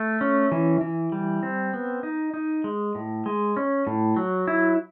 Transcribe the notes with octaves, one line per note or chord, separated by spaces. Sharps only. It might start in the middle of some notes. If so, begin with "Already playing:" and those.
Already playing: A3
C#4
E3
E3
G3
C4
B3
D#4
D#4
G#3
A2
G#3
C#4
A2
F#3
E4